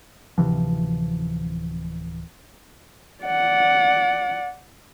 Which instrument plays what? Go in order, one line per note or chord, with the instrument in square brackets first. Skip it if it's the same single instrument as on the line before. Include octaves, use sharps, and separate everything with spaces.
[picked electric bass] D1 C3 E3 F3
[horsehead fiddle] D5 F#5